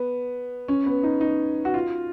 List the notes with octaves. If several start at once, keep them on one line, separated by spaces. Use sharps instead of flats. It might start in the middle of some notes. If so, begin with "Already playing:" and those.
Already playing: B3
C#4
B3
D#4
D#4
F#4
F4